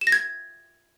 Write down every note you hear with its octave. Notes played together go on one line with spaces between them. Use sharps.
E7
A#6
G#6